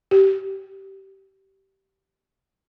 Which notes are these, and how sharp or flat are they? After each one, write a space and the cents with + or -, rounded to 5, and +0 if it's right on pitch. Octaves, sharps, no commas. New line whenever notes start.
G4 -20